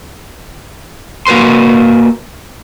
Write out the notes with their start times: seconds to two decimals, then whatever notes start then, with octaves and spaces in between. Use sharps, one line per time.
1.27 A#3 F#4 A#4 B4 C6